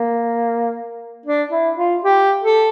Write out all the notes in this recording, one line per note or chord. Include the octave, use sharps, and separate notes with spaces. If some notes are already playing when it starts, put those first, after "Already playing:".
Already playing: A#3
D4
E4
F4
G4
A4